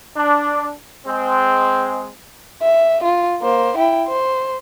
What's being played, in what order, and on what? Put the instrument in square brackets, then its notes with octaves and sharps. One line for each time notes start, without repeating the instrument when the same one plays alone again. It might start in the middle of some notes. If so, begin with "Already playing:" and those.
[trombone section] D4
G#3 C4
[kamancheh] E5
F4
A#3 C5
E4 G5
C5